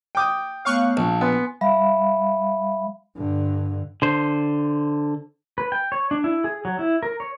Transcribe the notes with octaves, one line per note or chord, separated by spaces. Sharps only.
G5 D6 D#6
A3 B3 C#5 F5 C#6 F#6
A#1 A5
B3 G#5 C6
G3 E5 F5 B5
G2 D3
D3 C5
B4
G5
C#5
D4
E4
G#4
F#3
E4
A#4
C#5